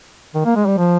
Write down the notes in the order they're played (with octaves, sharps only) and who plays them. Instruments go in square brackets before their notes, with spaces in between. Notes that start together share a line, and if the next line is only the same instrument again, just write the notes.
[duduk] D#3
A#3
G#3
G3
F3